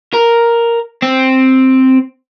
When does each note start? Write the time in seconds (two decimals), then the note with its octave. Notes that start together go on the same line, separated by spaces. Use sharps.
0.14 A#4
1.02 C4